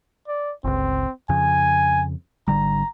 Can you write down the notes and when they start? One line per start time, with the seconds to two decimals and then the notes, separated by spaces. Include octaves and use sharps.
0.28 D5
0.64 G1 C#2 C4
1.29 F2 C#3 G#5
2.48 G#1 D3 G3 A#5